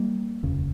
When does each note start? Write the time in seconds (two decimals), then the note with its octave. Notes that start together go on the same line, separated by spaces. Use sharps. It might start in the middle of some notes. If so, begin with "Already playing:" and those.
Already playing: G3 A#3
0.43 F1 D#2 C#3